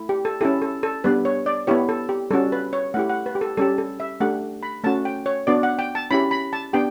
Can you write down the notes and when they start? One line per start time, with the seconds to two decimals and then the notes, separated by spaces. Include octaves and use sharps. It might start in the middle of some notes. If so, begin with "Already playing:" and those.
Already playing: A3 E4
0.09 G4
0.25 A4
0.41 C#4 E4 G4 A4
0.62 A4
0.83 A4
1.04 G3 B3 D4 B4
1.25 C#5
1.46 D5
1.67 B3 E4 G4 C#5
1.89 A4
2.09 G4
2.31 G3 C#4 F#4 A4
2.52 B4
2.73 C#5
2.94 A3 E4 G4 F#5
3.09 F#5
3.26 B4
3.35 G4
3.41 A4
3.57 G3 C#4 G4 A4
3.78 A4
4.00 E5
4.20 A3 D4 G4 F#5
4.63 B5
4.84 A3 C#4 F#4 A5
5.05 G5
5.26 C#5
5.47 B3 D4 F#4 D5
5.63 F#5
5.79 G5
5.95 A5
6.11 C#4 E4 G4 B5
6.31 B5
6.53 A5
6.73 B3 D4 G4 G5